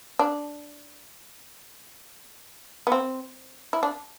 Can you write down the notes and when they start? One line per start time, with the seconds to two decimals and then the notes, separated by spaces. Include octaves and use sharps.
0.19 D4
2.87 B3
2.92 C4
3.73 E4
3.83 D4